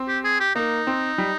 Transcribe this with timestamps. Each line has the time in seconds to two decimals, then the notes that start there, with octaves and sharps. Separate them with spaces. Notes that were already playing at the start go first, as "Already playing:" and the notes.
Already playing: C4
0.08 G4
0.24 G#4
0.40 G4
0.55 A#3 D#4
0.87 C4
1.18 G3